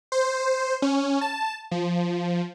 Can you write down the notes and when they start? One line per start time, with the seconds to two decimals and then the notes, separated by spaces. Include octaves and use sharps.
0.12 C5
0.82 C#4
1.21 A5
1.71 F3